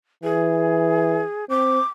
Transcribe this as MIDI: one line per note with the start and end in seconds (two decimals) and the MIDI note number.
0.24 1.22 52
0.24 1.45 68
1.50 1.79 60
1.50 1.85 86